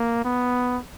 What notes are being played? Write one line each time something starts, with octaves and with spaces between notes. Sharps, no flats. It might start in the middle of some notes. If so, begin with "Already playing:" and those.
Already playing: A#3
B3